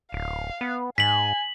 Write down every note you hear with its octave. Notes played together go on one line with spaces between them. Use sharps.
D1 F5
B3
G#2 G#5 B6 F#7